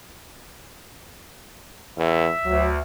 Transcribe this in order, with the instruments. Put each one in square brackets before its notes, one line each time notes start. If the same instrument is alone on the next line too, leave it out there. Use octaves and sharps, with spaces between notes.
[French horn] E2 [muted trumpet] E5
[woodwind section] D2 [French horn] F#3